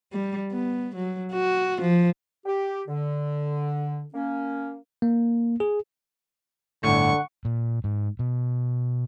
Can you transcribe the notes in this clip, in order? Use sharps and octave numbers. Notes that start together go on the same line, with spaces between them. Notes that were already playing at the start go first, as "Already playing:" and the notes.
G3
B3
F#3
F#4
F3
G4
D3
A#3 C#4
A#3
G#4
G1 A2 D3 F#5 C#6
A#2
G#2
B2